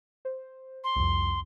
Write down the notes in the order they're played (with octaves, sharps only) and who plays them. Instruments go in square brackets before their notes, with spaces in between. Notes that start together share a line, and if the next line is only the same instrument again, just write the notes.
[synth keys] C5
[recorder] C6
[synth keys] C2 F2